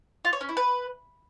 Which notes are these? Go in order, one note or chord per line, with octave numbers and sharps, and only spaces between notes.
F4
C#5
C#4
E4
B4